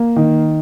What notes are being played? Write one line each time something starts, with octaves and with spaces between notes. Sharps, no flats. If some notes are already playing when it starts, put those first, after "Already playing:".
Already playing: A#3
D#3